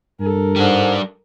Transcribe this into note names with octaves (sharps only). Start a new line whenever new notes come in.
G2 A4 A#4
G#2 G3 D4